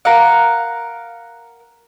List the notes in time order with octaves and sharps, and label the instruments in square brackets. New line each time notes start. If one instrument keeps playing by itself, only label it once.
[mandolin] A#4 F5 F#5